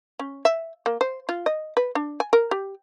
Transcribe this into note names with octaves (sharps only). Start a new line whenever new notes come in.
C#4
E5
A#3
C5
F4
D#5
B4
D4
G#5
A#4
G4